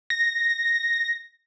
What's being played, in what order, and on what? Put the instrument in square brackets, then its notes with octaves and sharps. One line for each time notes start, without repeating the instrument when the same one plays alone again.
[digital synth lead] A#6